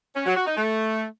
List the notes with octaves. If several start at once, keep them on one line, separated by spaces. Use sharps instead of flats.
C#4
F#3
F#4
D#4
A3